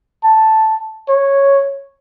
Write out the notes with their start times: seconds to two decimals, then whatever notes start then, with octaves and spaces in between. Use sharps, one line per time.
0.24 A5
1.08 C#5